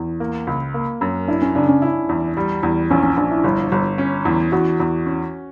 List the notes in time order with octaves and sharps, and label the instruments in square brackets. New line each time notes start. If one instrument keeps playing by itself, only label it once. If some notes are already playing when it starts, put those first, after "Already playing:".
Already playing: [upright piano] E2
A#3
C#2
A#3
F#2
[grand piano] D4 [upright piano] E4
[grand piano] C#4
[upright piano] C#3 [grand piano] D4
[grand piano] C#4
[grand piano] D4 [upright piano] E4
[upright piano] E2
G3
E2
[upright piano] A#1 [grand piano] C#4
[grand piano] C#4
[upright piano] A#1 [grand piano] D4
[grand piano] E4
[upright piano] G1
G1
C#4
E2
[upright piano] E2 [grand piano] F#4
[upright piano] E2
C#4